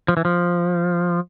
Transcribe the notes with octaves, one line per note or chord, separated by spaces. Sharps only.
F3
E3
F3